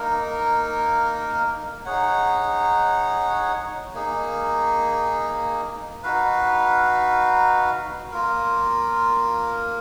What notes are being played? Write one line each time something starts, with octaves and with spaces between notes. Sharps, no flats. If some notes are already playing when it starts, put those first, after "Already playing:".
Already playing: A#3 D#4 A#4
D#4 G#4 C#5 F#5
A#3 D#4 G#4
D#4 F#4 B4 F5
A#3 F4 A#4